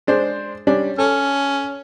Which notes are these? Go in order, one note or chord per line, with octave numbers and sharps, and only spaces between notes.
G#3 D4 C5
G3 C#4 D4
C#4 A4